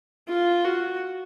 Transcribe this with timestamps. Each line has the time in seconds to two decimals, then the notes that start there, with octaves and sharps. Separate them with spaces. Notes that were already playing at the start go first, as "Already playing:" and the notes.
0.29 F4
0.65 F#4